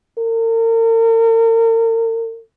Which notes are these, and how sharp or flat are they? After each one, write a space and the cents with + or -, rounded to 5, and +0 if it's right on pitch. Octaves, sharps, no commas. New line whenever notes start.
A#4 -40